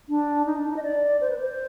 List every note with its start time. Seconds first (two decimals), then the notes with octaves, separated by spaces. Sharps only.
0.09 D4
0.46 D#4
0.58 D4
0.70 D#4
0.77 D#5
0.83 D5
1.21 C5
1.30 B4
1.40 C5